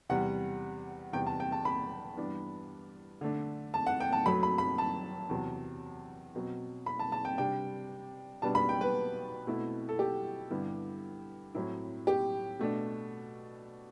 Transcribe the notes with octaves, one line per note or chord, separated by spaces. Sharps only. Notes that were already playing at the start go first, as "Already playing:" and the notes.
E2 C3 G3 F#5
E2 C3 G3 G5
A5
G5
A5
B5
G2 E3 B3 D4
D3 A3 D4
A5
F#5
G5
A5
F#2 F#3 A3 B5
B5
B5
A5
E2 C3 F#3
B2 F#3 C4
B5
A5
A5
G5
C3 G3 D4 G5
B2 G3 B3 D4 A5
B5
G5
B4
B2 A3 C4 E4
A4
G4
G2 D3 G3 B3 E4
A2 F#3 C4 E4
G4
B2 A3 D4